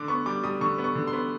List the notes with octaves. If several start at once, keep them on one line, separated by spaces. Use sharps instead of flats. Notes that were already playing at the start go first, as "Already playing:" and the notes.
Already playing: D3 D6
B3 C#6
G3 D6
G3 D#6
D3 C#6
B3
C#6
D3
C6
B3